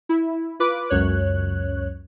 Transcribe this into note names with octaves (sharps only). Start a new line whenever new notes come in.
E4
F4 B4 D6
C#2 F#2 C#5 F#6